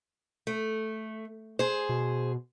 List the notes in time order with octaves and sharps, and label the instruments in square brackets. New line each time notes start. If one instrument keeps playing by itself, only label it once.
[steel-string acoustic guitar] A3
G#4 C5
[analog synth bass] B2